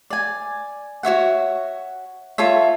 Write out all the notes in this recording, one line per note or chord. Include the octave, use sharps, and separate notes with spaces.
D5 G#5
F#4 C#5 E5 F#5
F4 A4 C#5 E5